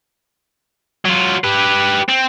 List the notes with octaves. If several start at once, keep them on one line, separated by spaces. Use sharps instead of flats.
F#3 F4
G4 B4
C4